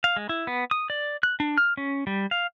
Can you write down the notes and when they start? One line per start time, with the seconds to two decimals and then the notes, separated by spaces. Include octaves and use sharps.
0.04 F5
0.16 G#3
0.29 E4
0.47 B3
0.71 D#6
0.90 D5
1.23 F#6
1.40 D4
1.58 F6
1.77 C#4
2.07 G3
2.31 F5